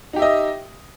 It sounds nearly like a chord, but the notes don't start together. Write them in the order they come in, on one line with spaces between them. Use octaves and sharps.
D#4 G4 E5 D#5